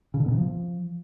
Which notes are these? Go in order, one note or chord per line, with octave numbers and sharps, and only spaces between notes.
C#3
D3
B2
C3
F3